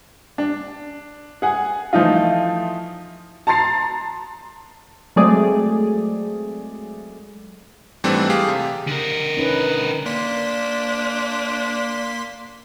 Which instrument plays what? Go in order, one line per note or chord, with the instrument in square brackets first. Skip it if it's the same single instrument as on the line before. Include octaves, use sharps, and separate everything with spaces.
[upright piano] D4
G#4 F#5 G#5
E3 F3 A3 D#4 F4
[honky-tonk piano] A5 A#5 C6 A6 C7
[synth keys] F#3 G#3 A3 C4 G#4 D5
[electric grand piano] G#2 E3 G3 A3 C4 D4
G4 G#4 F5
C3
[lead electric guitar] D3 A#4
[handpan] C#4 D#4 B4
[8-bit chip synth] A#3 C6 B6 [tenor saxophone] D4